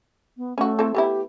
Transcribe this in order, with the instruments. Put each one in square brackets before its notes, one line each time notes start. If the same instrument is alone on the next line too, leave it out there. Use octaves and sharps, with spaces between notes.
[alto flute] B3
[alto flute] A3 [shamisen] C#4 F#4
[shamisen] C4 E4 A4
[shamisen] A3 B3 E4 [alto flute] G4